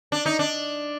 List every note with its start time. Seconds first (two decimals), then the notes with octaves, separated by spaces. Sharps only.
0.12 D4
0.26 D#4
0.39 D4